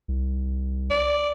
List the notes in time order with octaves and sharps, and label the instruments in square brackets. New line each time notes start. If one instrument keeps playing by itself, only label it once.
[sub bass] C2
[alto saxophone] D5